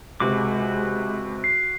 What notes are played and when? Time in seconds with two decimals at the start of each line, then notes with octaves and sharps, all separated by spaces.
0.20 C#2 C3 G#3 F#4 D6
1.44 C7